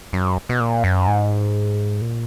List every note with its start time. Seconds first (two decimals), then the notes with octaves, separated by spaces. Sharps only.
0.13 F#2
0.49 B2
0.60 A#2
0.84 F#2
1.07 G#2
2.01 A#2